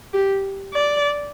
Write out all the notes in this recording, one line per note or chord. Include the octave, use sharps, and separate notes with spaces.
G4
D5